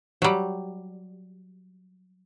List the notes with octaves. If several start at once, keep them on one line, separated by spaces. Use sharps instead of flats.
F#3 G3